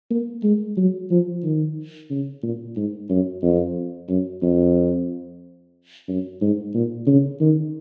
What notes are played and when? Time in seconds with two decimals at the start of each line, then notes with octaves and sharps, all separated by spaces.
0.11 A#3
0.43 G#3
0.77 F#3
1.11 F3
1.44 D#3
2.10 C#3
2.43 A#2
2.76 G#2
3.10 F#2
3.43 F2
4.08 F#2
4.42 F2
6.08 F#2
6.41 G#2
6.74 A#2
7.07 C#3
7.41 D#3